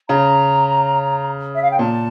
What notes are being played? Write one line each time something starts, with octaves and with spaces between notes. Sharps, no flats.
C#3 A#5
E5
F5
G5
A#2 A5